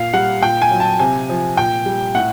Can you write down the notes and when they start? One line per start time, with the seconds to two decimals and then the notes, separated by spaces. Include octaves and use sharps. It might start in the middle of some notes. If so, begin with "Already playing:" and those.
Already playing: A#2 F5
0.13 G3 F#5
0.42 A#2 G5
0.62 G#5
0.71 F#3
0.80 A5
0.99 C3 G#5
1.29 F3
1.57 A#2 G5
1.86 G3
2.15 A2 F#5